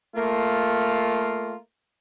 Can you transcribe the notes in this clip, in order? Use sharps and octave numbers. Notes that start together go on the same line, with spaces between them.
A3 A#3 F4